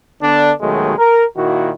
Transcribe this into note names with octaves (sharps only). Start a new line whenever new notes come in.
D3 B3 D4
D#2 B2 D#3 F#3 G#3 A3
A#4
A#2 D#3 A#3 E4 F#4